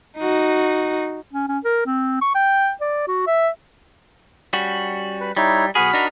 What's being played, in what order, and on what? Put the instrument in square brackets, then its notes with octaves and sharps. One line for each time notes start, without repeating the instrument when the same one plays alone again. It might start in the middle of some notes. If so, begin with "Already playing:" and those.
[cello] D#4 F#4
[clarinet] C#4
C#4
A#4
C4
C#6
G5
D5
F#4
E5
[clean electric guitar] G3 C#4 F#4
[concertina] B4
[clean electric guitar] G3 [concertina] D#4 E4 C#5
[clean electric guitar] B1 B3 G#4 [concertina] F#4 B5 F6
[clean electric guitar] D4 D#4 A#4